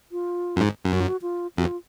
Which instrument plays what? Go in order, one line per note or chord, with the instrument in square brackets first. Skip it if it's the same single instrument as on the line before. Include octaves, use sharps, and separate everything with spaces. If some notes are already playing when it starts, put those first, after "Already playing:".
[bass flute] F4
[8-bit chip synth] F#2
G#2
F#2
[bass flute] F#4
F4
F#4
F4
[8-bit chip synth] F2 [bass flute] F#4
[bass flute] F4